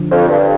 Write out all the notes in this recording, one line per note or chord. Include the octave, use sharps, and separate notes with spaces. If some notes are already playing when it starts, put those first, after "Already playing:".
Already playing: D3 F3
F2
G2